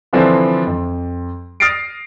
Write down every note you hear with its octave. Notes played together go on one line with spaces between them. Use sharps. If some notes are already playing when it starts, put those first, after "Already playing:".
D3 E3 F3 C4 D4 E4
F2
D#6 F6 A6 A#6 C7 D7